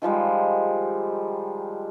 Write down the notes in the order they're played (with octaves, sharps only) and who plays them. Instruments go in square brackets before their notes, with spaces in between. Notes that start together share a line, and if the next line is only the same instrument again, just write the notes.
[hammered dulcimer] D#3 F3 G3 G#3